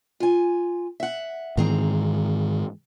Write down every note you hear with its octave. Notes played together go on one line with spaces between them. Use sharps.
F4 G#5
E5 F#5
G#2 D#3 E3 C4 G#4 A#5